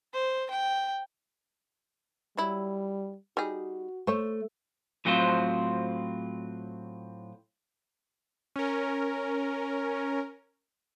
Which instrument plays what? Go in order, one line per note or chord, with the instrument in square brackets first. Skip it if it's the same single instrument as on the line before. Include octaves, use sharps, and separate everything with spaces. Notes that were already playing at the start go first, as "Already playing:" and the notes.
[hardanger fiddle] C5
G5
[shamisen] F#3 E4 [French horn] G3
[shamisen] G3 D#4 G#4 [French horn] F#4
[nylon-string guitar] A3 [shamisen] C5 C#5 E5
[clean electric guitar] A2 F#3 C4 F4 C5
[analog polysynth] C#4 A#4